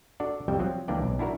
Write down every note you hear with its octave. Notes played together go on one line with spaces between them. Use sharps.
D4 F#4 A4 D5
C2 F2 G3 E5 G5
F3 F#3 C4
C#2 E3 A#3 D4 D5 G5
B1
D4 E4 F#4 A#4